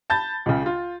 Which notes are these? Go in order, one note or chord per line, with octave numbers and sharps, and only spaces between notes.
A5 B5 G6 A6
C#2 C#3
F4